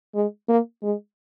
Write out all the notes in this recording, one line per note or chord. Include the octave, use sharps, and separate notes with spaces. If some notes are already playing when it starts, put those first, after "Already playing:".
G#3
A#3
G#3